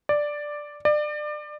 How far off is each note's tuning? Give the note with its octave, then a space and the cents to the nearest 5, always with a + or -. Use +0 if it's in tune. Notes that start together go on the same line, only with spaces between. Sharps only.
D5 +5
D5 +30